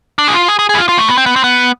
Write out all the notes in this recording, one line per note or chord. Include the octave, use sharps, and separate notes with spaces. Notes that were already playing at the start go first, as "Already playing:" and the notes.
D4
G#4
F4
G#4
G#4
G#4
E4
F4
F4
A3
B3
C4
B3
C4
B3